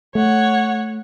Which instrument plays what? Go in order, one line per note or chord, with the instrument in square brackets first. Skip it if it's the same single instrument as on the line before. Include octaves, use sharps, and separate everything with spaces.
[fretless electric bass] A3 [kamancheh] C#5 F#5